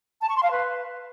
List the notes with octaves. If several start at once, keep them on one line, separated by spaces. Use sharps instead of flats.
A5
C#6
C6
F5
B4